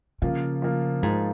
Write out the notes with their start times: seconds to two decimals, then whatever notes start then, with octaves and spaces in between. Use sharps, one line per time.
0.22 C#3 F3 A#3 F4
0.62 F3 A#3 F4
1.03 G#2 F3 A#3 F4